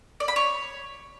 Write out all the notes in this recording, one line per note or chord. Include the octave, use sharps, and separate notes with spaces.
D5
B5
C#5